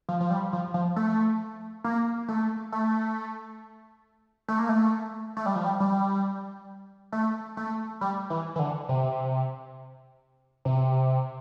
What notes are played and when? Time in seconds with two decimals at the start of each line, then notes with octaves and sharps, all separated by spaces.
0.09 F3
0.20 F3
0.31 G3
0.53 F3
0.74 F3
0.96 A3
1.84 A#3
2.28 A3
2.72 A3
4.48 A3
4.59 A#3
4.69 A3
5.37 A3
5.46 G3
5.56 F3
5.64 G3
5.80 G3
7.12 A3
7.57 A3
8.01 G3
8.30 E3
8.56 E3
8.59 D3
8.89 C3
10.65 C3